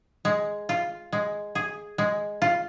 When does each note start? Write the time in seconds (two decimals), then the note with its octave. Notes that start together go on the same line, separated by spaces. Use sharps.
0.25 G#3
0.69 F4
1.12 G#3
1.55 G#4
1.98 G#3
2.42 F4